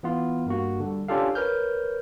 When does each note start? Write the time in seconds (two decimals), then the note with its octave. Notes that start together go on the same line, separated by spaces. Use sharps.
0.03 E3 B3 F4
0.46 G2 A#3 F#4
0.80 D3 G3
1.08 C#4 D4 F4 G4 A4 F5
1.35 A#4 B4 C#5 F6 G6